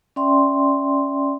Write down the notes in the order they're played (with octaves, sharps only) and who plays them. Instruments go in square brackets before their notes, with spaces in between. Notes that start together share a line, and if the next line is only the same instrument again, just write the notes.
[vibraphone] C#4 D5 E5 G5 C6